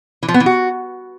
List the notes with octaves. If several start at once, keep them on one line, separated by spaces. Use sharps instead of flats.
E3
F3
B3
E3
F#4